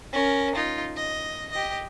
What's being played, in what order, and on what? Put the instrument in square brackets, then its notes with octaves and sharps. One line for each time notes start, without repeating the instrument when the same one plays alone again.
[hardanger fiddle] C#4 A#4
D#4 F4
D#5
G4 D#5